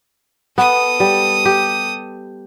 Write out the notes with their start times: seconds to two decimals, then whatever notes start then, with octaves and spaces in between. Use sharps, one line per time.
0.58 B3 A4 D#6
1.00 G3
1.45 G4